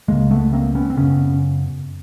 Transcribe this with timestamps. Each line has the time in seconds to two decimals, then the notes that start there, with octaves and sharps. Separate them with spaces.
0.08 C#2 C#3 G#3 A#3
0.31 A3 B3
0.53 A#3 C4
0.75 B3 C#4
0.90 C4
0.97 F#2 C#3 B3 C#4